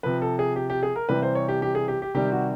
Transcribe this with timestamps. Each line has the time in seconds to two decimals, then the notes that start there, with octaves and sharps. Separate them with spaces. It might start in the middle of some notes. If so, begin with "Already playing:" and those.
0.03 C3 F3 B4
0.22 A4
0.39 G#4
0.56 G4
0.70 G4
0.83 G#4
0.96 A#4
1.09 C3 E3 G3 B4
1.22 C5
1.35 C#5
1.49 G4
1.62 G4
1.75 G#4
1.88 G4
2.02 G4
2.14 C3 D#3 G3 G4
2.32 F#4